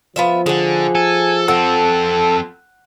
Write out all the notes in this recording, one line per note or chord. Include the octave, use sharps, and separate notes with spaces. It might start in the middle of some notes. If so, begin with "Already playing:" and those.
F3 B3 F4 E5
D3 G#4 F#5
A4 G#5
F2 C4 A4 F#5